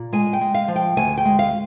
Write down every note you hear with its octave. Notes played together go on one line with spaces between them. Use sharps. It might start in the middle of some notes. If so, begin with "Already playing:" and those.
Already playing: A#2
G#3 G#5
G5
G#3
F5
F3
G5
D2 G#5
G5
G#3
F5